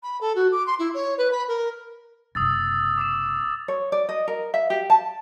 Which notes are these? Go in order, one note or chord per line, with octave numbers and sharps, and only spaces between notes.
B5
A4
F#4
D6
C6
E4
C#5
B4
B5
A#4
F#1 C3 D#6 E6 A6
D6 D#6 E7
C#5
D5
D#5
A#4
E5
G4
A5